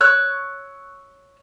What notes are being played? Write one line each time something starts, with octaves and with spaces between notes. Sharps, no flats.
C#5 E6 F#6